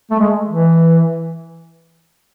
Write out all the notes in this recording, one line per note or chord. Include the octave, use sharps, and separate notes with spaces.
A3
G#3
E3